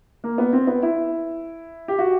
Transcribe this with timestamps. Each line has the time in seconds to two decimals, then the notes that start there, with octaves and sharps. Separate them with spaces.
0.24 A#3
0.38 B3
0.53 C4
0.67 B3
0.83 E4
1.88 G4
1.99 F#4